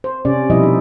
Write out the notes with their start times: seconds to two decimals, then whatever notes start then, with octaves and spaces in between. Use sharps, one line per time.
0.04 C5
0.25 C3 C#4 D5
0.50 B2 F3 G3 E4 D#5
0.63 D#4